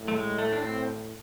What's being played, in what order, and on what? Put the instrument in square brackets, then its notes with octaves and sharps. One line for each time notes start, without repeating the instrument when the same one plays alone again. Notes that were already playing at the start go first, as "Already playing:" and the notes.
Already playing: [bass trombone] A2
[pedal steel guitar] A3
G#3
A3
D4
C4